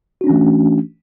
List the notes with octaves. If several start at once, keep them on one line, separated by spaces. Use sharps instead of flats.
E3 A3 C#4 D4 F#4